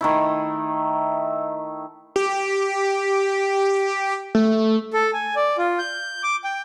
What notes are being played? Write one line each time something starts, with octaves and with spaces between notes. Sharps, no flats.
D#3 A3 E4
G4
A3
A4
G#5
D5
F4
G6
D6
G5